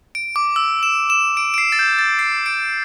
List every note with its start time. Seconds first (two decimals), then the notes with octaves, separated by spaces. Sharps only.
0.15 D7
0.36 D6
0.56 E6
0.83 E7
1.10 E7
1.37 D7
1.54 D7
1.58 C7
1.72 A6
1.79 G6
1.99 A6
2.19 C7
2.46 D7